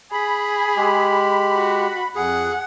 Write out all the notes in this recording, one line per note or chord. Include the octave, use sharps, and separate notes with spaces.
G#4 B5
G#3 G4
F#4
F2 G#4 F#5